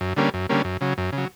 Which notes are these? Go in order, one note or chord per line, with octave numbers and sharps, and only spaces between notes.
F#2
D3 G3 A#3 C#4
F#2
D3 G3 A#3 C#4
F#2
C#3 F#3
F#2
C#3
F#3